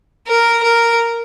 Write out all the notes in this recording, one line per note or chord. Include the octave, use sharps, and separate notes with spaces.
A#4
A#4